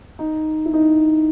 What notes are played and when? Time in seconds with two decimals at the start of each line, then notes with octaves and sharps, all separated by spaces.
0.19 D#4
0.66 E4
0.74 D#4